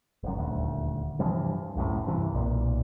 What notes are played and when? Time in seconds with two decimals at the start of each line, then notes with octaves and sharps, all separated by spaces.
0.23 F1 F#2
0.35 D#1 D2
1.19 G2 C3 E3 F3
1.75 E1 C2 F#2 A2
2.07 G2 C3 E3
2.34 B1 A#2